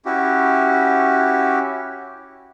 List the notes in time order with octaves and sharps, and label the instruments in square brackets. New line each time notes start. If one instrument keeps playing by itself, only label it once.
[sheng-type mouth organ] C#4 E4 F#4 G4